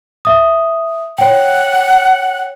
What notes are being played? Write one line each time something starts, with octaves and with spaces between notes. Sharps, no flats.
E5 D#6
C#5 F#5 G5